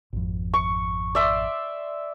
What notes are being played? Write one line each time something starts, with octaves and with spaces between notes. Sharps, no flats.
G#1 F2
C#6
D5 E5 C6